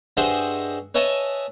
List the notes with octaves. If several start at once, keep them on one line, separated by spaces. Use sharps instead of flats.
G2 F#4 G#4 C5 D#5 E5
B4 C#5 D#5 E5 G#5 A5